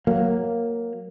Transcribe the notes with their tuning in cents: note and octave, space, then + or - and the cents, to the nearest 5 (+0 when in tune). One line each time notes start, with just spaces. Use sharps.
F#3 -10 A#3 +0